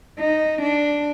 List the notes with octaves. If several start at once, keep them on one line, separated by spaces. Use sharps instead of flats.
D#4
D4